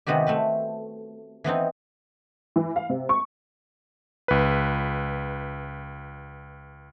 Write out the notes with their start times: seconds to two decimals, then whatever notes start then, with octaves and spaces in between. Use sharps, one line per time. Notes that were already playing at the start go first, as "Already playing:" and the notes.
0.07 C3 D#3 G#3 B3 F#4 G4
0.27 A3 C4 B4
1.44 E3 B3 C4 D#4
2.56 E3
2.76 F5
2.89 C3
3.09 C#6
4.28 C#2 B4